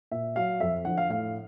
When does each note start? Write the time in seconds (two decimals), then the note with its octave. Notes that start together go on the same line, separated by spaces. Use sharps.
0.11 A#2 E5
0.36 F#3 F5
0.60 F2 E5
0.85 D3 F3 F#5
0.98 F5
1.09 A2 F5